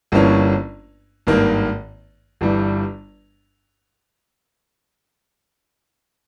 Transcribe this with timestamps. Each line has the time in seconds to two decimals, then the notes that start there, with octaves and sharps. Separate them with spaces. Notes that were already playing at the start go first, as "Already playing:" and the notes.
0.12 G1 G2 E3 A#3 C#4
1.27 G#1 G2 D#3 A#3
2.41 G1 G2 E3 G3